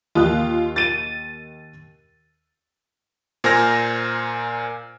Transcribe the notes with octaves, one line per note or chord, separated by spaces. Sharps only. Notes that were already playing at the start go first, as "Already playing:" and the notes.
D#2 F4 D#6 F#6
A6 D#7
A#2 A#4 C5 G#5 F6 A#6